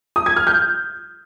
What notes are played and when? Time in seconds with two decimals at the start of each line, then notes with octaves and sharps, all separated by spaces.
0.16 D#6
0.26 G#6
0.36 F6
0.47 G6